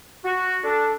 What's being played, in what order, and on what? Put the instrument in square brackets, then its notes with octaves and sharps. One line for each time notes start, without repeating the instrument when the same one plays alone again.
[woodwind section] F#4
[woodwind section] D4 [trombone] A4